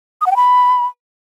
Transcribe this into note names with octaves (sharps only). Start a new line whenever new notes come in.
D#6
F#5
G5
B5